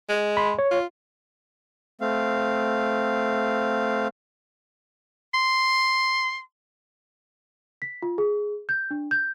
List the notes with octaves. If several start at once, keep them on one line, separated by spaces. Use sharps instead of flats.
G#3
B5 C6
C#5
F4
A3 C4 F5
C6
B6
F4
G#4
G6
D4
G6